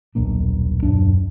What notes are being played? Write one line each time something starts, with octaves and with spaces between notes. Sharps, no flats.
D#1 B1 A#3 D4
D#1 F#2 D4